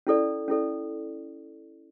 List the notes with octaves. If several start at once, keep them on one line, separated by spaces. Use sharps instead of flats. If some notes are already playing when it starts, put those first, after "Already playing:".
C#4 E4 A4 D5
C#4 E4 A4 D5